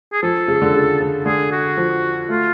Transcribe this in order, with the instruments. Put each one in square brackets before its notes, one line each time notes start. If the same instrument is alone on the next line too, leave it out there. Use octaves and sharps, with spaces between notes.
[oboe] G#4
[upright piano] F3 [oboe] A4
[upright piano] C#3
D3
C#3
C#3
[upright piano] D3 [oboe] G#4
[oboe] F#4
[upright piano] F3
[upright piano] A3 [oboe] F4